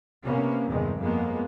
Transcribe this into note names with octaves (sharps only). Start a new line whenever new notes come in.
C3 A#3 B3 C#4
E2 G2 C3 D#3 G#3
F2 G#3 A#3 B3